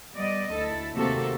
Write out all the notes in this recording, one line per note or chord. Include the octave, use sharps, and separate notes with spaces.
G3 B3 D5 D#5
D2 E4 A4
D#2 C3 A3 A#3 F#4 A4